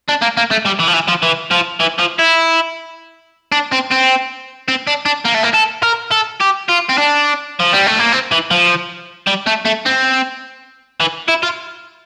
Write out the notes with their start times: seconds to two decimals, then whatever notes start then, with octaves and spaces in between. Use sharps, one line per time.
0.08 D4
0.22 A#3
0.37 A#3
0.51 A3
0.66 G3
0.80 E3
0.88 F3
0.94 E3
1.08 F3
1.23 E3
1.51 F3
1.80 E3
1.99 F3
2.19 E4
3.52 D4
3.72 C4
3.91 C4
4.68 C4
4.87 D4
5.05 D4
5.25 A#3
5.34 A3
5.43 A#3
5.54 A4
5.83 A#4
6.11 A4
6.40 G4
6.69 F4
6.89 C4
6.98 D4
7.60 F3
7.73 G3
7.87 A3
7.99 A#3
8.12 C4
8.32 E3
8.51 F3
9.27 G3
9.47 A3
9.65 A3
9.86 C4
11.00 E3
11.28 E4
11.43 F4